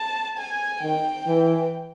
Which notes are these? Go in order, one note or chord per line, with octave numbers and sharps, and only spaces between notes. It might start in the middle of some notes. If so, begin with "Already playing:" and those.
Already playing: A5
G#5
D#3 G5
E3